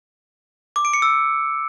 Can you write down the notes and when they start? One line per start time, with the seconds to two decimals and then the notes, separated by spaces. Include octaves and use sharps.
0.76 D6
0.85 D7
0.94 C#7
1.02 E6